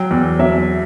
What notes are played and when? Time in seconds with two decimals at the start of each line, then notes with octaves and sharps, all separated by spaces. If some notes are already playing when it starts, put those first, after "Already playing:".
Already playing: F#3 G5
0.11 E2
0.39 F#3 E5